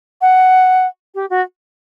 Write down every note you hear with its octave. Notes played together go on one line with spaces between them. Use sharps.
F#5
G4
F#4